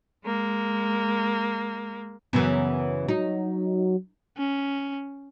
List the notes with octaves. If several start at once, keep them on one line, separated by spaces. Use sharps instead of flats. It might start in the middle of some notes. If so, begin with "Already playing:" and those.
G#3 A#3
F#2 C#3 E3 B3
F#3 D#4
C#4